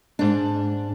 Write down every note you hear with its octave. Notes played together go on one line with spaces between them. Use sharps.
G#2 D4